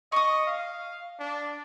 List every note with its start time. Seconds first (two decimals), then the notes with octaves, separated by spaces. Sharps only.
0.12 D#5 C#6 D#6
0.47 F5
1.19 D4